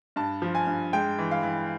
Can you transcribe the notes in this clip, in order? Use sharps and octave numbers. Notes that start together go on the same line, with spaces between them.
G2 A5
F3
G#5
G2
G#3 G5
E3
F5
E3